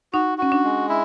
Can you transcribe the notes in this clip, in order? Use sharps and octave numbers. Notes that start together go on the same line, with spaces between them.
D#4 F#4
C#4 F#4
D4
G#3
E4